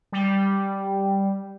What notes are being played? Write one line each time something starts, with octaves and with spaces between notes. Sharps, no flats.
G3